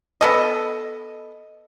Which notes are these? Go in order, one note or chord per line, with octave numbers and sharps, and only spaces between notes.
B3 A4 D#5